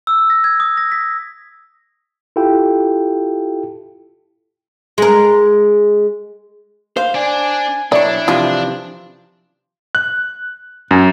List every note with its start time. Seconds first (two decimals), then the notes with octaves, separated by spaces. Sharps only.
0.07 E6
0.30 A#6
0.44 G#6
0.60 D#6
0.77 A#6
0.92 B6
2.36 E4 F4 G4 A4 G5
4.98 G#3 A#4
6.97 C5 F5
7.15 D4 D5 G#5
7.92 B1 D4 E4 C#5 D5
8.28 C3 E3 F3 F4
9.95 F#6
10.91 F#2